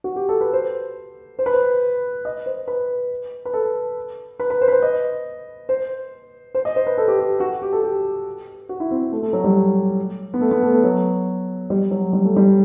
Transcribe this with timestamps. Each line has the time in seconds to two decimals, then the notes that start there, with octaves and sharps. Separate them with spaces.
0.04 F#4
0.16 G4
0.29 A4
0.41 B4
0.53 C5
1.39 C5
1.46 B4
1.54 C5
2.25 D#5
2.46 C5
2.68 B4
3.45 B4
3.53 A4
4.40 B4
4.50 B4
4.61 C5
4.68 B4
4.72 C5
4.82 D#5
5.69 C5
6.55 C5
6.65 D#5
6.76 C5
6.87 B4
6.98 A4
7.08 G4
7.19 G4
7.40 F#4
7.62 G4
7.73 A4
7.83 G4
8.69 F#4
8.80 E4
8.91 C4
9.12 A3
9.22 A3
9.33 F#3
9.44 G3
10.34 B3
10.41 A3
10.51 B3
10.63 A3
10.73 A3
10.84 F#3
11.70 G3
11.91 F#3
12.13 G3
12.25 A3
12.36 G3